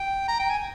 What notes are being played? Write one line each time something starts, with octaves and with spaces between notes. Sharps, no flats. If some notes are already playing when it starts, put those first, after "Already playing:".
Already playing: G5
A#5
G5
G#5